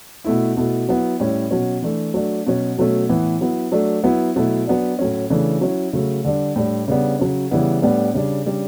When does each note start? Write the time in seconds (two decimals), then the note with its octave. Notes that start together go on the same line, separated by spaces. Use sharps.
0.24 B2 A3 E4
0.57 B2 A3 E4
0.89 F#3 B3 E4
1.20 A2 G3 C#4 E4
1.51 B2 F#3 C#4
1.82 E3 A3 D4
2.14 F#3 A3 D4
2.46 B2 F#3 C#4
2.78 B2 F#3 A3 C#4
3.09 A2 E3 B3 E4
3.41 F#3 B3 E4
3.72 F#3 A3 D4
4.04 F#3 B3 E4
4.36 B2 F#3 A3 E4
4.67 F#3 B3 D4
4.99 A2 F#3 A3 C#4
5.30 C#3 E3 A3 D4
5.61 F#3 C#4 E4
5.93 C#3 F#3 A3
6.25 D3 G3 D4
6.56 A2 G3 D4
6.88 C#3 G3 B3 D4
7.19 C#3 F#3 C#4
7.51 C#3 E3 G3 B3 E4
7.82 A2 G3 B3 D4
8.14 C#3 G3 D4
8.46 C#3 G3 D4